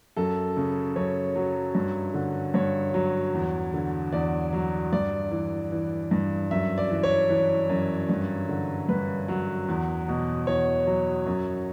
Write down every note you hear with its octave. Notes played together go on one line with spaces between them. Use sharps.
F#2 A4
C#3
F#2 C#5
F#3
G2
D3
G2 C#5
F#3
E2
D3
E2 D5
F#3
G2 D5
E3
E3
G2
F#2 E5
D5
E3
C#5
E3
F#2
G2
D3
G2 B4
F#3
E2
B2
E2 C#5
F#3
F#2